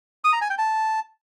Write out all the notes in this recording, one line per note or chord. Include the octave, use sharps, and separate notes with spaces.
D#6
A#5
G#5
G5
A5